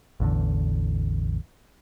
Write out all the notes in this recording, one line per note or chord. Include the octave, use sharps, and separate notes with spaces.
A1 E2 D3